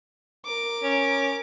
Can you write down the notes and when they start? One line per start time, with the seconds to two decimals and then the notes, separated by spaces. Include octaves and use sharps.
0.45 A#4 D6
0.83 C#4